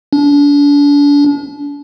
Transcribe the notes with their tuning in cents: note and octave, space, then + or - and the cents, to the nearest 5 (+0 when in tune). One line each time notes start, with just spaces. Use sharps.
D4 -35